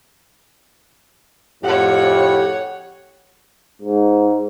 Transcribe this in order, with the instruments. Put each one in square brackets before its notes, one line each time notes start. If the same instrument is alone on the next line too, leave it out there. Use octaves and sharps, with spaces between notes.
[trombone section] F2 A2 [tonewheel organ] G4 [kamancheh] C#5 F#5
[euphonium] G#2